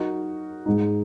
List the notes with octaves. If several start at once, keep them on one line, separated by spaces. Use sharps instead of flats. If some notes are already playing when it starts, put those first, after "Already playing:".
Already playing: F#3 D#4 F#4 A#4
G#2 G#3 D#4